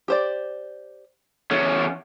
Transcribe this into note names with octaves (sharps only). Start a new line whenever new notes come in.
G4 C5 D5
E2 C#4 A4